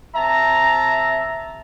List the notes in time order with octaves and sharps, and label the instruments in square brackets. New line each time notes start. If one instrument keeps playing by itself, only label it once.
[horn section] C3 E5 A5 A#5